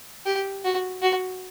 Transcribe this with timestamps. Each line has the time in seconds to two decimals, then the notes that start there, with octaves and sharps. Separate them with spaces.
0.26 G4
0.64 F#4
1.02 F#4